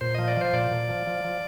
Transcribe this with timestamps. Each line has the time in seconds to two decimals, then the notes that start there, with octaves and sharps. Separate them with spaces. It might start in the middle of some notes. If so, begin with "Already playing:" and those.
0.01 A#2 C5
0.15 F3 D#5
0.28 D5
0.37 F3 C5
0.53 A#2 D5
0.71 A#2
0.89 F3
1.07 F3
1.25 F3